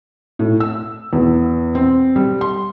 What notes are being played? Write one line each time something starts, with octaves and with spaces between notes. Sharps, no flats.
A2
E6
E2
C4
G3
C6